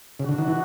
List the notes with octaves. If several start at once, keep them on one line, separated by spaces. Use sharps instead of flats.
C#3 B3 D4 F#4
D3
D#3
E3